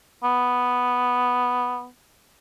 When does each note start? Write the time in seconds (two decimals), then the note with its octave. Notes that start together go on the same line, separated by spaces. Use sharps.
0.24 B3